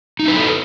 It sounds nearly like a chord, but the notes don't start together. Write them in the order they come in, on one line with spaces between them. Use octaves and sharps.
D#4 E4 B4 G#4 A4